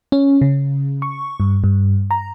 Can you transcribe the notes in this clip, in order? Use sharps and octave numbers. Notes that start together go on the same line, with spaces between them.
C#4
C#3
C#6
G2
G2
A#5